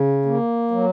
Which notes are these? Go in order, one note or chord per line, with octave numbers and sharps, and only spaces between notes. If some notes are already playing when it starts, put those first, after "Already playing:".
Already playing: C#3
A#3
F#3